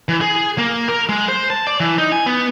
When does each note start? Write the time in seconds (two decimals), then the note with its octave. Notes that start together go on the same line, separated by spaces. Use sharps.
0.09 E3
0.21 G#4
0.58 A#3
0.89 A#4
1.09 G#3
1.28 C5
1.50 A5
1.67 D5
1.80 E3
1.98 D#4
2.12 G#5
2.26 B3